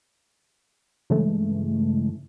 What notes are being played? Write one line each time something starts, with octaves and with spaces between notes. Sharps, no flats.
G2 C#3 E3 G#3 A3